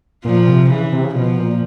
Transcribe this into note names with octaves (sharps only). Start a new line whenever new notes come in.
A#2 F3
C3
C#3 E3
C3
C#3
B2 F3
A#2